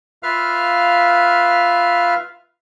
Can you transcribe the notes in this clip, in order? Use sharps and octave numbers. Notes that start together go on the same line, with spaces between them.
F4 B4 E5 F5 F6